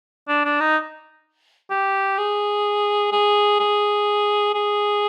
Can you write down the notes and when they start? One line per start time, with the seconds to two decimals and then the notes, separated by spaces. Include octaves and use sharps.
0.28 D4
0.45 D4
0.60 D#4
1.70 G4
2.18 G#4
3.12 G#4
3.59 G#4
4.54 G#4